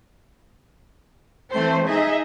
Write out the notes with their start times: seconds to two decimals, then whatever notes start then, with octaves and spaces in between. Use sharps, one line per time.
1.52 E3 A3 C4 C5
1.88 D#4 G#4 D#5 E5